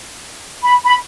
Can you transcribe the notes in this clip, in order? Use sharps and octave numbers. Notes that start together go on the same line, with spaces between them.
B5
B5